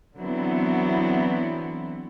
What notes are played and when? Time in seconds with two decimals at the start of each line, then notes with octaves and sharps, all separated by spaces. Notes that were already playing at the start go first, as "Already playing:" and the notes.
0.17 D3 E3 F#3 B3 C4 E4